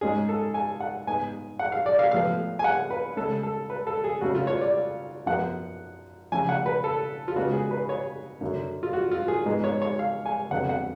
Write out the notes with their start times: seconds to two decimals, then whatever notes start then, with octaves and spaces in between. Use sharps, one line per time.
0.01 G#2 G#3 C#4 G#4
0.29 A4
0.54 G#5
0.80 F#5
1.07 G#2 G#3 B3 G#5
1.59 F#5
1.72 F5
1.86 D5
1.99 F5
2.11 A2 F3 B3 F5
2.59 G#5
2.64 F#5
2.91 B4
3.16 C#3 G#3 C#4 A4
3.43 A4
3.70 B4
3.87 A4
4.04 G#4
4.21 C#3 F#3 A3 C#4 F#4
4.35 F4
4.47 C#5
4.61 D5
5.26 F#2 F3 B3 F#5
6.32 C#3 F3 A3 C#4 G#5
6.49 F#5
6.66 B4
6.84 A4
7.28 F4
7.36 C#3 G#3 B3 F#4
7.53 G#4
7.71 B4
7.89 C#5
8.41 F#2 D3 F#3
8.83 F4
8.93 F#4
9.11 F4
9.28 G#4
9.46 G#2 G#3 B3
9.64 C#5
9.82 C#5
9.99 F5
10.26 G#5
10.51 F2 D3 F#3 B3 F#5
10.69 F#5